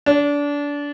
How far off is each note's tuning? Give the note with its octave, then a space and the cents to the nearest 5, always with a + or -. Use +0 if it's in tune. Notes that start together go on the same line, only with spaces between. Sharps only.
D4 -25